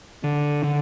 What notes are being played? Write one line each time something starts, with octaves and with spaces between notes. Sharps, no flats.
D3
D3